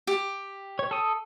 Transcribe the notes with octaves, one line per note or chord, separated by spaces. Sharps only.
G4
C#5
A4 D#6